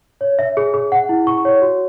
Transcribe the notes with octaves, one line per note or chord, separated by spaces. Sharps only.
C#5
E5
G#4
G#4
F#5
E4
C#6
C#5
F#4